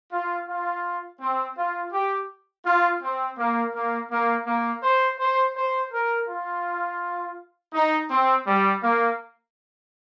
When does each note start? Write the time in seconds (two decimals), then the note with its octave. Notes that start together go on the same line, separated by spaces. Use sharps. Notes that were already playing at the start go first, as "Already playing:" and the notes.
0.12 F4
0.48 F4
1.21 C4
1.57 F4
1.93 G4
2.65 F4
3.03 C4
3.38 A#3
3.74 A#3
4.11 A#3
4.47 A#3
4.83 C5
5.19 C5
5.56 C5
5.92 A#4
6.28 F4
7.73 D#4
8.10 C4
8.46 G3
8.82 A#3